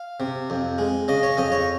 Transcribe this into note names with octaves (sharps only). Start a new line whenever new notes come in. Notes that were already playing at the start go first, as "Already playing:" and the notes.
Already playing: F5
C3
F2
G#3
C#3 D#5
C#5
F2 D#5
C#5